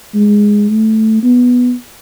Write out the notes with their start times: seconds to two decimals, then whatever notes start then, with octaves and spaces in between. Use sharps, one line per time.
0.14 G#3
0.69 A3
1.23 B3